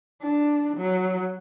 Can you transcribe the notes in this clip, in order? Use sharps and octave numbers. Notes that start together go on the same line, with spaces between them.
D4
F#3